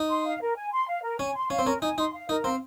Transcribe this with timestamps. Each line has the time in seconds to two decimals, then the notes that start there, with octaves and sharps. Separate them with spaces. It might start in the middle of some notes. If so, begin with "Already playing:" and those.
Already playing: D#4
0.10 C6
0.26 F5
0.41 A#4
0.56 G#5
0.73 C6
0.88 F5
1.03 A#4
1.19 C#4 G#5
1.35 C6
1.50 C#4 F5
1.59 C4
1.66 C#4 A#4
1.82 D#4 G#5
1.98 D#4 C6
2.14 F5
2.29 D#4 A#4
2.44 C4 F5